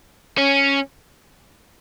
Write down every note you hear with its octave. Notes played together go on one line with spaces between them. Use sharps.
C#4